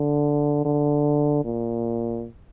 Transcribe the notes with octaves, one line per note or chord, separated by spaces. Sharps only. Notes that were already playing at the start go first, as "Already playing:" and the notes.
Already playing: D3
D3
A#2